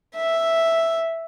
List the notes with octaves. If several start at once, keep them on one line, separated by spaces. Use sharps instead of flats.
E5